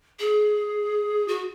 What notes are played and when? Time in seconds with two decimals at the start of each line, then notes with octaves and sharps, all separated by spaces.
0.19 G#4
1.28 F#4